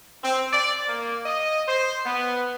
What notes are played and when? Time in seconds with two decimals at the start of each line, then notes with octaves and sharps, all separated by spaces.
0.23 C4
0.52 D5
0.88 A#3
1.25 D#5
1.67 C5
2.06 B3